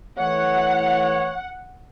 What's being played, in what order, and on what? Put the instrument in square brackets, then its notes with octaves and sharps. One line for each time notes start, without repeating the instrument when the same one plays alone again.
[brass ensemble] E3 A3 C#5 [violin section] F#5